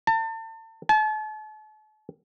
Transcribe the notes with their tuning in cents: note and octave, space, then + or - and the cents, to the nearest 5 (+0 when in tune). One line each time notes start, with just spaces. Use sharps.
A5 +35
A5 -40